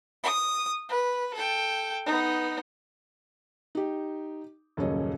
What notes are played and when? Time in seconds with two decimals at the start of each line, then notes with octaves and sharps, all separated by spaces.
0.24 D#6
0.89 B4
1.34 A4 G5
2.06 B3 D#4
3.75 D#4 G4
4.77 D#1 F#2 C#3 C#4 D#5